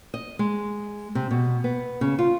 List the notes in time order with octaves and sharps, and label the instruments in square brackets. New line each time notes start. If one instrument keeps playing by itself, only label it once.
[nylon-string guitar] D#5
G#3
C3
B2
B3
C#3
F4